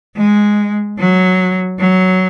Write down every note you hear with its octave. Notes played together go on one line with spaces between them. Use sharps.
G#3
F#3
F#3